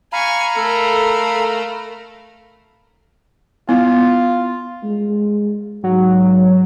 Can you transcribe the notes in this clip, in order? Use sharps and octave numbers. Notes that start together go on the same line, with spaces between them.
F5 G#5 A#5 B5 C#6
A3 A4 A#4
B3 E4 F4
G#3
G#2 F#3